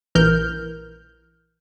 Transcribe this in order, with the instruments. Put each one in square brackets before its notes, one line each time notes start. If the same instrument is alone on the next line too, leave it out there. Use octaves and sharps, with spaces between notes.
[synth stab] A#1 E3 A#4 F6 G6